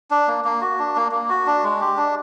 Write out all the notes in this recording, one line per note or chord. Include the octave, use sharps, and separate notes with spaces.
D4
A#3
A#3
F#4
D4
A#3
A#3
F#4
D4
G#3
G4
D4